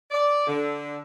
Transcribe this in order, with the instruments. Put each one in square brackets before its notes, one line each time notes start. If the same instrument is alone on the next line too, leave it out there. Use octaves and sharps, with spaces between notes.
[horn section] D5
D3